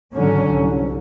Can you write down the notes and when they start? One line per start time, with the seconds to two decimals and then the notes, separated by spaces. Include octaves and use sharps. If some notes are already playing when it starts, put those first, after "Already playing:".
0.14 G#1 D3 F#3 C#4
0.51 C2